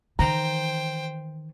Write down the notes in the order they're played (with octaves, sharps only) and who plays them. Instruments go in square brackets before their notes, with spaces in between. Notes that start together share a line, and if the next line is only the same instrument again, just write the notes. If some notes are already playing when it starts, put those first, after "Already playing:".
[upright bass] D#3 E3 [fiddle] C5 G5 [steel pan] A#5